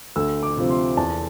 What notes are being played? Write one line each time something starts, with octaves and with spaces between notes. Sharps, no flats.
D2 E6
D6
C3 F3 C4
C6
E2 A5